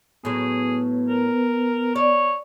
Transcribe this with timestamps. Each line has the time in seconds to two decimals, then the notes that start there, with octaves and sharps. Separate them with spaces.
0.25 A2 F#3 B3 G#4
1.09 A#4
1.96 C#5 D5